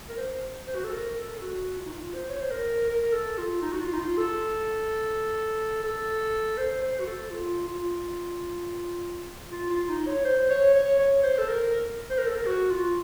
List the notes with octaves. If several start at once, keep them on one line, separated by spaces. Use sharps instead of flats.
A#4
C5
C5
F#4
A4
A#4
A4
A4
F#4
F4
D#4
F4
C5
C#5
C5
A#4
A#4
A4
F4
D#4
F#4
F4
D#4
F4
A4
A4
C5
C5
F#4
A4
F4
F4
F4
F4
D#4
C#5
C5
C#5
C#5
C#5
C5
A4
A#4
C5
A#4
A4
A#4
F#4
F4